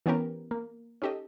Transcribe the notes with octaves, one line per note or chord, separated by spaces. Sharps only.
E3 B3 C#4 G4 A#4
A#3
C#4 D#4 G4 A4 D#5